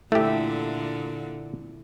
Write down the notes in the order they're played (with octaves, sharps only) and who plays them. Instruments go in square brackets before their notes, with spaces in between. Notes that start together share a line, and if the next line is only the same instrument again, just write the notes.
[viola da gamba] A#2 D3 [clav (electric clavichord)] A3 G4 [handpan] E4 E5